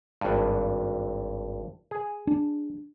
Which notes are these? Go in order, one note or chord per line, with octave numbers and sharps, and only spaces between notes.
G#1 G2
G#4
D4